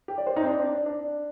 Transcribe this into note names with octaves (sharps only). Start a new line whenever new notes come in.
G4
D5
C5
D#4
C4
D4
D4
D4
D4